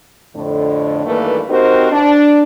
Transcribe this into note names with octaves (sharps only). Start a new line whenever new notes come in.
F2 A2 D3
G2 D#3 E3 A3 A#3
C4 D#4 F#4 G4 A#4 C5
D4